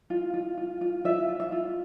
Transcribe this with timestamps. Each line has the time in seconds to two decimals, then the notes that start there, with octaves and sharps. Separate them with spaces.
0.10 F4
0.34 F4
0.57 F4
0.81 F4
1.04 F4 E5
1.28 F4
1.40 E5
1.52 F4